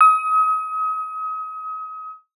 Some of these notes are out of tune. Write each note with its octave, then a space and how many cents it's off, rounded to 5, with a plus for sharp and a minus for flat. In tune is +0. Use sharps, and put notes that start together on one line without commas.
D#6 +35